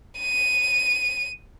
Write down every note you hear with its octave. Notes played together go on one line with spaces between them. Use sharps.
D#7